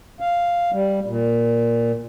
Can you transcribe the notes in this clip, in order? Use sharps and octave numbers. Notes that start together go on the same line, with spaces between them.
F5
G3
A#2